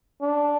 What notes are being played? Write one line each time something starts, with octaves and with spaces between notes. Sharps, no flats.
D4